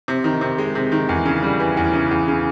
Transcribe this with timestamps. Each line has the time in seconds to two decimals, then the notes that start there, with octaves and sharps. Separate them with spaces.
0.08 C3
0.24 D#3
0.41 C3
0.58 G#3
0.75 C3
0.92 D#3
1.09 E2
1.26 C#3
1.43 G3
1.60 E3
1.77 E2
1.93 C#3
2.11 E2
2.28 C#3